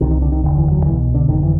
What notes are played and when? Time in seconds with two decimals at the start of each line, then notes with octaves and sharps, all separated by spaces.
0.01 C2 C3 D#3
0.11 D#3
0.22 D3
0.32 D#3
0.44 F1 D#2 D3 D#3
0.57 E3
0.71 F#3
0.86 C2 B2 E3
1.14 D3
1.28 G1 F2 D3 D#3
1.43 E3